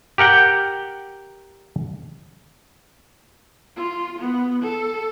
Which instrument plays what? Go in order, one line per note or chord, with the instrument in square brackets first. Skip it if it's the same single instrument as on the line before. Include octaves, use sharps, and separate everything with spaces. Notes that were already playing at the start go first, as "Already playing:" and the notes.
[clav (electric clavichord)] G4 A#4 F#5 G5
[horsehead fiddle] F4
B3
A4